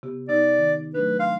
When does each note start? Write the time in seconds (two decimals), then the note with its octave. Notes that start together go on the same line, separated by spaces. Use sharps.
0.03 C3 B3 G4
0.29 C3 B3 D#4 D5
0.58 D#3
0.95 F#3 A3 D4 B4
1.20 F5 C6